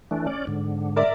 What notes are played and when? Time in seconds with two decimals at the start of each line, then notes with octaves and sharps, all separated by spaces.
0.11 E3 A3 D4
0.27 C#4 D5
0.47 G#2 D3
0.96 A#4 D5 E5